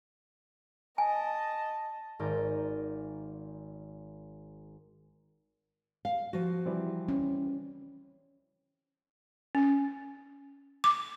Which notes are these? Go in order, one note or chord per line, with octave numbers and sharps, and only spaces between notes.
D#5 G#5 A5
G#1 G#2 A#4 D5 G#5 G6
F5
F3 F#4
E3 G3 C4
C#4
C#4
D6